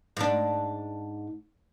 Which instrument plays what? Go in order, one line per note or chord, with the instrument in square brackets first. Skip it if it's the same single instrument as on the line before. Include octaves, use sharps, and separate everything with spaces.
[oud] G#2 D4